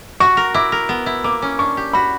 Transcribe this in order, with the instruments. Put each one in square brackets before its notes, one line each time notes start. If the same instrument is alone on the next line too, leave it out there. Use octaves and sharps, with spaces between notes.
[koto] F#4 [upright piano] C#6
[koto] A#4
[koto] E4 [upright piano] D6
[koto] A#4
B3
E4
[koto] A#3 [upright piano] D6
[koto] C#4
[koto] D4 [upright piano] C#6
[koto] G4
[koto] F#4 [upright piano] B5